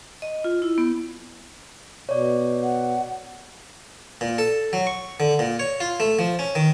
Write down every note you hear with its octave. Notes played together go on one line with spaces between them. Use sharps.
D#5
F4
E4
B3
B2 C#5 D5
F#5
A#2
A4
F#3
C#6
D3
A#2
C#5
F4
A3
F3
C#4
D#3